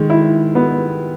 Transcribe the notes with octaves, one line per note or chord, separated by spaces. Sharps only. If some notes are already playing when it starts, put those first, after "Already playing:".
Already playing: D#3 G#3
E4
B3